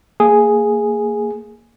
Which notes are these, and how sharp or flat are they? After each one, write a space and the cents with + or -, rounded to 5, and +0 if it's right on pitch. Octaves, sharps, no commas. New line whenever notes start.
A#3 -25 G#4 +0